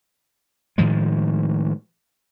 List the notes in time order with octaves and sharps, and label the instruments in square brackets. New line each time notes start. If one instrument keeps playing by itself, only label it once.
[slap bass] A2 D#3 F3 G#3